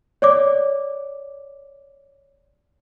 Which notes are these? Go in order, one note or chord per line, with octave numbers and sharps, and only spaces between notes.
C#5 D5 D6